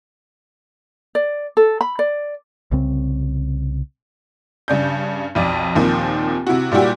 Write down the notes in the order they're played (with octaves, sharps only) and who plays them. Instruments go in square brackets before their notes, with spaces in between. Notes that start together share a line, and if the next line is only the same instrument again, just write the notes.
[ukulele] D5
A4
B5
D5
[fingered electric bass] C2 C#3 C4
[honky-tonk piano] G2 C#3 D4 G6
B1 F2 D5
D#2 A#2 D#3 F3 C4
C3 E4 F#4
A#2 G3 E4 F#4 G4